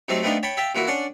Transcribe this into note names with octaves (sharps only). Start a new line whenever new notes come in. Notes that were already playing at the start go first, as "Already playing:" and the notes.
C3 F#3 A3 C4 D#4
A3 B3 C4 D4 D#4 F4
C#5 G5 A5 B5
E5 F5 G5 A5
A#2 E3 E4 F#4
C#4 D4 D5 F#5